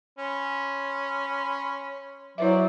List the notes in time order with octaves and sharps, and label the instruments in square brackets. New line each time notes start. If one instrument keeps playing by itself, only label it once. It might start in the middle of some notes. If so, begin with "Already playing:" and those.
[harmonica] C#4 B5 C6
[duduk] F#3 [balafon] E4 B4 E5 [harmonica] C5 D5